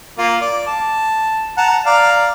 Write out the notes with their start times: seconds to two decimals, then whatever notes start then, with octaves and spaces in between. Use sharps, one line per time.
0.18 A#3 F4
0.41 D5
0.67 A5
1.58 F#5 A5 A#5
1.86 D5 F5 A#5